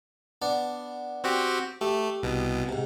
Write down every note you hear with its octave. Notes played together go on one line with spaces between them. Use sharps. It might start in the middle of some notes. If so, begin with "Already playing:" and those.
B3 D4 D5
C4 F#4 G4
A3 G4
C2 B2
G#2 C3